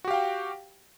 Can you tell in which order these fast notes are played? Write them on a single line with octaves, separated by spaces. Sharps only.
F#4 G4 F5 G5